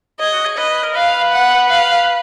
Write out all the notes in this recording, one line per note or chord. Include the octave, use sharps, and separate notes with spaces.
G#4 D#5
F#4
G#4
B4 D#5
B4
A#4
B4 F5
F#5
F5